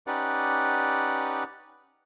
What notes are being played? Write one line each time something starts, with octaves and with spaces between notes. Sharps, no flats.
C#4 D#4 G4 B4 D5 F#5